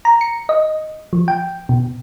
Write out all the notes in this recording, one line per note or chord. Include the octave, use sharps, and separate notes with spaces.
A#5
C#7
D#5
F3
G5
B2